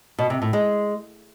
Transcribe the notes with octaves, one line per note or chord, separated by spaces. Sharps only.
B2
C3
A2
G#3